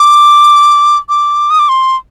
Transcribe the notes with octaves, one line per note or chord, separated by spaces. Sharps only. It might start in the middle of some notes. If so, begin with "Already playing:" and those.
Already playing: D6
D6
D#6
D6
C6